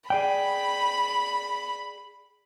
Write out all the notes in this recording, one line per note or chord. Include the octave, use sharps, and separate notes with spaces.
G#4 D5 G5 B5